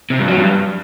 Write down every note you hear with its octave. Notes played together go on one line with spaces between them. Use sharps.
C3
G2
F#3
G2